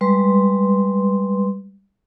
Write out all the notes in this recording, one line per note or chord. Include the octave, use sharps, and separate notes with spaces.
G3 G#3 B4 C6